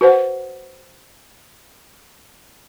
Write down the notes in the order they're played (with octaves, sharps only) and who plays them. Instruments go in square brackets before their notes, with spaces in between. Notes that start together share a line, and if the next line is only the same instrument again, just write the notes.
[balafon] F#4 B4 C5 F#5